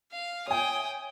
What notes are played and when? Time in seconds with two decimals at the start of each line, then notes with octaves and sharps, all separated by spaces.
0.12 F5
0.47 C#5 E5 G5 G#5 D#6